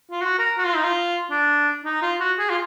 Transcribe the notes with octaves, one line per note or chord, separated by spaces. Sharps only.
F4
F#4
A#4
F#4
F4
D#4
F4
D4
D#4
F4
F#4
G#4
F4